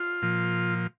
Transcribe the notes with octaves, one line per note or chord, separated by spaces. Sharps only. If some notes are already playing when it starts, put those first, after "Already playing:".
Already playing: F4
A#2 F3